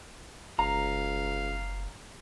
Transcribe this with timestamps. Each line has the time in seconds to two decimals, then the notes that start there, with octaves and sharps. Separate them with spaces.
0.59 F#1 C#2 F5 A#5